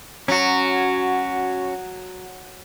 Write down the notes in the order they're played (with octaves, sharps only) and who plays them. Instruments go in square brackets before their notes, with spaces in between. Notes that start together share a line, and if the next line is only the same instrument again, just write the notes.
[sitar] F#3 [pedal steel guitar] C#4 F#4